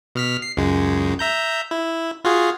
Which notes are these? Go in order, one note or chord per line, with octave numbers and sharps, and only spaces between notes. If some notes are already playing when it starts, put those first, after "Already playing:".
B2 F6 B6
C7
C#2 F#2 G#3
E5 A#5 G6
E4
F4 F#4 G#4